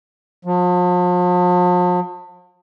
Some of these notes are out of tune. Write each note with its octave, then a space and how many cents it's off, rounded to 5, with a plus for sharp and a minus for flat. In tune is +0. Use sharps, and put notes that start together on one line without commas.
F3 +40